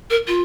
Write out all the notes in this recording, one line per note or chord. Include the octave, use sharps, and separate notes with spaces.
A#4
F4